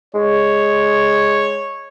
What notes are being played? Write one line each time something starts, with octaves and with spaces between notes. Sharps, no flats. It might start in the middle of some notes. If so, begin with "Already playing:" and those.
G#3 C#5